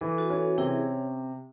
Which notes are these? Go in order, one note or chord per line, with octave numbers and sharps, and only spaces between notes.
E3 A4
F#4 A4
C#4 F#4 A4
C3 E4 G#4